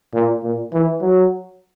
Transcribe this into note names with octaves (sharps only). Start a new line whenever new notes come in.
A#2
A#2
E3
F#3